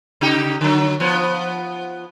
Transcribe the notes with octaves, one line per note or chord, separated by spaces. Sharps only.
C#3 D#4 G4
D3 F#3
F3 B3